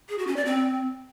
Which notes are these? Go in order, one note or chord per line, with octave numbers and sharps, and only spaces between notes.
G#4
F#4
C#4
D5
C4